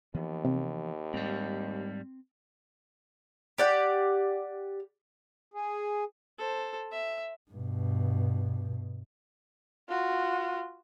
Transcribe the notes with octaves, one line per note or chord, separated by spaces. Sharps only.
D#2 E3 F3 B3
C3
G#2 G3 C4
G4 D5 F#5
G#4
A4 C5
E5
G2 B2
F4 F#4